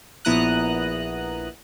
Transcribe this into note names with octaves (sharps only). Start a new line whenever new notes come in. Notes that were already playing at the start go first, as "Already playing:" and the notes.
A#1 B3 E4 A#5 D#6 F#6